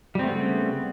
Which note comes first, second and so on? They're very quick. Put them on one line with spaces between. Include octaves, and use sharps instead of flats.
G3 C4 A3 B3 C#3